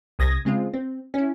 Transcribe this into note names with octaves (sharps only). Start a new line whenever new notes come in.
C2 C3 D#6 G#6 A#6
C#3 G#3 C4 F4
C4
C#4 E4